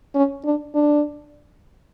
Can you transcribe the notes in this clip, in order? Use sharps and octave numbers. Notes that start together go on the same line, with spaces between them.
C#4
D4
D4